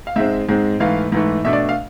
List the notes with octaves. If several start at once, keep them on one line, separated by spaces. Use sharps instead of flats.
F5
G#2 G#3 C4 E5
G#2 G#3 C4
G#2 E3 A3 F5
G#2 E3 A3
B2 A3 D4 E5
D5
F5